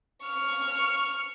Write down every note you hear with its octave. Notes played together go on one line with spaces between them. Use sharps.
C#6 F6